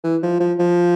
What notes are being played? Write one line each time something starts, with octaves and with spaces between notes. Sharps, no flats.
E3
F3
F3
F3